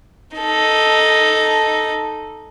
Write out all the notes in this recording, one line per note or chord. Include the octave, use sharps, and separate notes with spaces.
D#4 A4